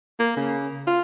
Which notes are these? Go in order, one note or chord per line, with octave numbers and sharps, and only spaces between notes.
A#3
C#3
F4